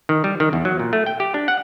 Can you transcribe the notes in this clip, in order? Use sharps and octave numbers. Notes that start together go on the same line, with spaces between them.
D#3
G3
D#3
E2
F#3
A#2
A3
G5
G4
D4
F#5